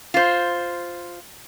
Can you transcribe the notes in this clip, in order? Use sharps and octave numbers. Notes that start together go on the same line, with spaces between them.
F4 C5